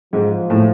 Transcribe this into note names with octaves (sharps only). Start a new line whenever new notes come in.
G#2 F3
A2